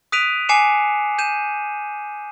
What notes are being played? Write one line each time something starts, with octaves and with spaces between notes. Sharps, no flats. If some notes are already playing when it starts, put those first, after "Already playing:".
D#6 F#6 B6 D7 D#7 F7
G#5 D6 C7 C#7 E7
G6 D#7 E7